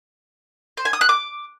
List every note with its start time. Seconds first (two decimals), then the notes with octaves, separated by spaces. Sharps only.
0.77 C5
0.85 G#5
0.93 D#6
1.01 F#6
1.09 D6